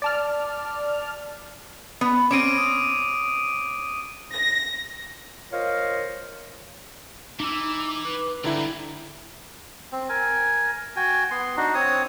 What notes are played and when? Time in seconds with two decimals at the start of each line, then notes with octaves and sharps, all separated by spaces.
0.02 D5 A5 F6
2.01 B3
2.31 C4 C#4 D6 D7 D#7
2.58 D#6
4.35 A#6
5.52 F4 A#4 C5 C#5 D#5 F5
7.40 E3 D#4 D6 E6
8.05 B4
8.44 C#2 G2 D3 E4 G5 A#5
9.92 C4
10.09 A#4 G#5
10.96 F#4 G5 G#5
11.31 B3 C6
11.57 D4 D#4 F#4
11.75 C4 C#5 D#6